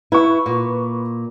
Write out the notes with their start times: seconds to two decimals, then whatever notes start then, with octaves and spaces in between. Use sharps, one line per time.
0.12 E4 B4 C#6
0.46 A#2